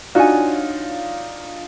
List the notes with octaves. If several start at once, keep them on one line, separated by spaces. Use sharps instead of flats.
D4 D#4 F4 F#4 C#5 G#5